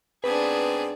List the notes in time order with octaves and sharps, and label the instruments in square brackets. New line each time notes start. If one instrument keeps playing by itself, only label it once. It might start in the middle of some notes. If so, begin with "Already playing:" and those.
[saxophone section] G#2 B3 C4 [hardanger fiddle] D4 G#4 [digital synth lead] B4